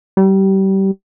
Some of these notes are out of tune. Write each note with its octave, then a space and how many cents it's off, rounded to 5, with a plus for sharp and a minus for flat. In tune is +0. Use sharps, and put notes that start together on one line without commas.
G3 -25